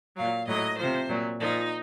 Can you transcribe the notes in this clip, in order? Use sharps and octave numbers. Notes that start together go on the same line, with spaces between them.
A#2 F#3 F5
A2 F#3 D#5
C3 F3 C5
A#2 F#3
A#2 F3 D#4